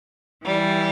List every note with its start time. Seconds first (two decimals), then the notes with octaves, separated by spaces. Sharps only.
0.45 E3 G3